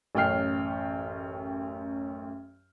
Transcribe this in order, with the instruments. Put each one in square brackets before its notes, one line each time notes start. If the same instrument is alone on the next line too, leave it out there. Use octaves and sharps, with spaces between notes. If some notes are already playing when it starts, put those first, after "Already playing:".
[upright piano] A1 F#2 C#4 G5 F6 C7